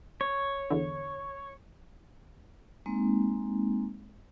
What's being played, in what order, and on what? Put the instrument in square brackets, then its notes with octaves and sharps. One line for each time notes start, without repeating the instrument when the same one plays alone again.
[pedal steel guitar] C#5
[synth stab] E2 D3
[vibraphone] G#3 A#3 C4 D#4